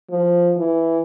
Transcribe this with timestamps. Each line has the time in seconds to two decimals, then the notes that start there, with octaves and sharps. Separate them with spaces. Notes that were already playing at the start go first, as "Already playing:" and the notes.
0.10 F3
0.57 E3